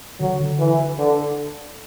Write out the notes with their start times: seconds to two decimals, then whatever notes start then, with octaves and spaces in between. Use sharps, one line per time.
0.20 D3 F#3
0.40 D3
0.59 E3
0.98 D3